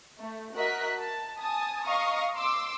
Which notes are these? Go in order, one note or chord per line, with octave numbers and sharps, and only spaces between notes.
A3
F#4 A#4 D#5 E5 F#6 B6
A5
G#5 A5 D#6
D#5 F5 A#5 C#6 D#6
C6 D6 E6